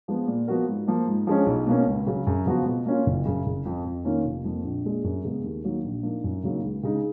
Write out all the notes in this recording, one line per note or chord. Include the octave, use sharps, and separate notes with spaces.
F3 G#3 B3
A#2
F3 B3 F#4 A#4
G#2
F3 A#3
G#2
F3 G#3 C#4
B1
B2 A#3 C#4
C#2
C#3 F#3
F#2
C#3 F3 B3 F#4
B2
A#3 C#4 F4
F#1
F#2 C#3
F#1
F2 F3
F2
D#3 A#3 C#4 F4
F1
F2 F3 A#3
A#1
A#2 G#3
F#2
C#3 G#3 B3
D#2
D#3 F#3 A#3
A#1
A#2 F3 A#3 D#4
F#2
C#3 F#3 A#3 D#4
C#2
C#3 G#3 D#4